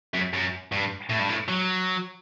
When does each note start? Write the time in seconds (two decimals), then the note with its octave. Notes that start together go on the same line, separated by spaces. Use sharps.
0.14 F#2
0.33 F#2
0.72 G2
1.10 A2
1.19 G2
1.29 A2
1.48 F#3